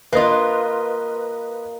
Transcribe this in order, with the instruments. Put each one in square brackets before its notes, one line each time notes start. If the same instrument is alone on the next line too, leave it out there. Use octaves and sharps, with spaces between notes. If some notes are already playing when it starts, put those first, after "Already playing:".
[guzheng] A#3 F4 [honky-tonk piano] B4 D#5